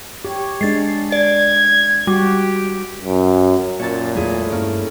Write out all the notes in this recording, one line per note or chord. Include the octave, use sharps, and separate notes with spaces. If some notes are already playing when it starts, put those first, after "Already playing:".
G4 C#5
G#3 D4 A6 C7
D5 G#6
G3 F#4 G4
F#2
F#2 A#2 C#5 A5 A6
E2 F#3 G#3 A3 E4 G#4
G2 A#3 C#4